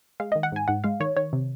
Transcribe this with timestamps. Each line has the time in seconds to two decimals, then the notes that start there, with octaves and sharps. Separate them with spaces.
0.20 G#3 F5
0.32 D#3 D#5
0.43 F#5
0.52 G#2 G#5
0.68 G#2 F#5
0.84 G#3 F5
1.00 D#3 C#5
1.16 D#3 C#5
1.33 C3